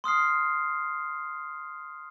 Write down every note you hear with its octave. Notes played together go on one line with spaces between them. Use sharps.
C6 D#6 F6 C7